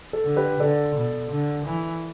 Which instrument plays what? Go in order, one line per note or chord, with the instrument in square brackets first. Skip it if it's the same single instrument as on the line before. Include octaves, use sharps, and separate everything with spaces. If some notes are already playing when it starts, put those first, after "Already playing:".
[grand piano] A4
[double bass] D3
[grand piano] G4 B4
[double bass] D3 [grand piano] A4 D5
[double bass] B2
D3
E3